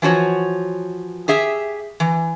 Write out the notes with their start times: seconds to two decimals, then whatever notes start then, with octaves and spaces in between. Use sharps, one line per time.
0.02 E3 F3 F#4 C#5
1.28 G4 G#4 E5
2.00 E3